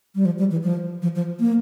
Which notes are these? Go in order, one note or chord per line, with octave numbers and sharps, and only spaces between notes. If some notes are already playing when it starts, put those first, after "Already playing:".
G3
F3
G3
E3
F3
F3
F3
A#3